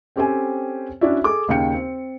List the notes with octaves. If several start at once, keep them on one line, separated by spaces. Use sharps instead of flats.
C4 C#4 G4 A4 C5 G#5
C#4 D4 E4 F#4 D5 E5
G#4 A4 D6
D#2 C#3 F5 G5 C#7
C4